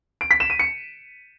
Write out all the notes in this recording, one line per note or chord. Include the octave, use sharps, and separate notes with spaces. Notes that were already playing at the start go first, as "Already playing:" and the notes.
D7
B6
E7
D#7
C#7